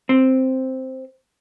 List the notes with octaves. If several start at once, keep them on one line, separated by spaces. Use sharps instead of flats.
C4